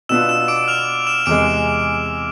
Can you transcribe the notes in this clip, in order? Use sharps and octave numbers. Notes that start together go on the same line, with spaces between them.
B2 B3 D4 F4 E6 E7
E6 E7
D6 D7
F6 F7
E6 E7
E2 C3 G#3 D6 D7